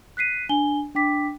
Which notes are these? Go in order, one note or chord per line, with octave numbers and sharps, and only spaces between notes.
F#6 B6 C7 D#7
D4 G#5 G7
D4 G5 D6 B6